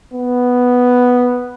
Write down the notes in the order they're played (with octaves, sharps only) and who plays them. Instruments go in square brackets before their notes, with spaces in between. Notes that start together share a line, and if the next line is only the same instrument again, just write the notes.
[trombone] B3